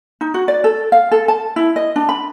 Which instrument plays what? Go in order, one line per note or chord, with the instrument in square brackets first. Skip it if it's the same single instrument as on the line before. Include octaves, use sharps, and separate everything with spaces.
[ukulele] D#4
F#4
D5
A4
F5
A4
A5
E4
D#5
D4
B5